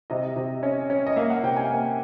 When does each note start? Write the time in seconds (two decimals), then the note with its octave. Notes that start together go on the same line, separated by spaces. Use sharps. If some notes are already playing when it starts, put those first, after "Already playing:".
0.10 C3 D#5
0.36 C3
0.63 C#4
0.90 C#4
1.07 D#5
1.16 A#3 E5
1.30 F#5
1.43 C3 G5
1.57 G#5
1.70 A#3